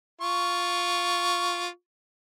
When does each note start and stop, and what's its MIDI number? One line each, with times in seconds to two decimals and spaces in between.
0.21 1.67 65
0.21 1.67 85